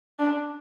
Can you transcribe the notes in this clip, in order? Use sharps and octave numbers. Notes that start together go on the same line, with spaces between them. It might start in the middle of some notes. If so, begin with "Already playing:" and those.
D4